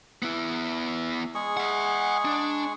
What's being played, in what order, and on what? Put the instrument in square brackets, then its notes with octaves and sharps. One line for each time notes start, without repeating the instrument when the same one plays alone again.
[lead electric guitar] B3 E4
[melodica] G#3 G#4 C#6
[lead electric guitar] E5 F#5
D4